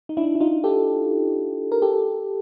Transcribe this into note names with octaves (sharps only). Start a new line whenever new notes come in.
D#4
D4 E4
E4
D#4 F4
G4 A4
A#4
G4 A4